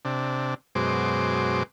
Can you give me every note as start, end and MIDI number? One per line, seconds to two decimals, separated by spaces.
0.05 0.54 48
0.05 0.54 62
0.75 1.63 42
0.75 1.63 47
0.75 1.63 56
0.75 1.63 72
0.75 1.63 86